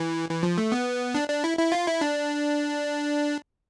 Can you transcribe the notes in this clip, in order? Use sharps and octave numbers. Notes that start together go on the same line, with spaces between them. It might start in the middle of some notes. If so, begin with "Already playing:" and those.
Already playing: E3
E3
F3
A3
B3
D4
D4
E4
E4
F4
E4
D4